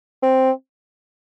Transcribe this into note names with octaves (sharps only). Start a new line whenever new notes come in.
C4